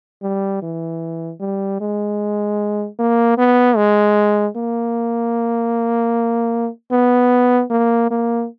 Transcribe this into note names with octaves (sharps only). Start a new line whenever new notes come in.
G3
E3
G3
G#3
A#3
B3
G#3
A#3
B3
A#3
A#3